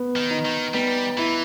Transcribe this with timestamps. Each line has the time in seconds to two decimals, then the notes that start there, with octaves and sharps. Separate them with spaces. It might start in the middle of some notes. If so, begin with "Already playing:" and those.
Already playing: B3
0.16 D#3
0.30 D#4
0.45 D#3
0.74 G3 B3
1.17 E3 E4